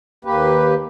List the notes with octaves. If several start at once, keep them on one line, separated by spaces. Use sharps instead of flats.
D#2 A#3 G4 B4